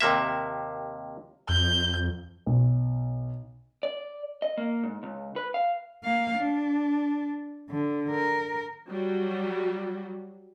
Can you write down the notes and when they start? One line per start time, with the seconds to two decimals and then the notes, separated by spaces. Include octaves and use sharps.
0.01 D#2 C3 A#3 E5
1.49 F2 G6
2.46 B1
3.83 D5
4.42 D#5
4.58 A#3
4.83 G#2
5.03 C#2
5.36 B4
5.54 F5
6.04 A#3 F5
6.38 D4
7.70 D3
8.10 A#4
8.89 F#3 G3 F#4